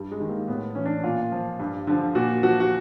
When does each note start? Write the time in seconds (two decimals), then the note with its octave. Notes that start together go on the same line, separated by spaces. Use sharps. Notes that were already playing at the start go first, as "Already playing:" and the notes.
Already playing: G2 G3
0.11 G#3
0.20 D#3
0.29 A#3
0.48 A2 B3
0.75 E3 C#4
0.86 D4
1.04 A#2 F4
1.32 F3
1.60 G2
1.87 D3 F3
2.15 A#2 F#4
2.43 F3 F#4
2.60 F#4